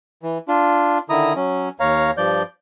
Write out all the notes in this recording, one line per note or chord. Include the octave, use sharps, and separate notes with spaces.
E3
D4 F4
D3 D#3 E4 A#5 D#6
F#3 C#4
D#2 C#5 F5 A#5
G2 F3 D5 G6